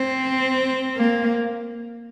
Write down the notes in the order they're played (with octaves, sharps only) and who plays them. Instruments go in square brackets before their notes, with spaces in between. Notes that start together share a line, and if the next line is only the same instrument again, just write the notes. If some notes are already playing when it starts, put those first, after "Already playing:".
Already playing: [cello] C4
A#3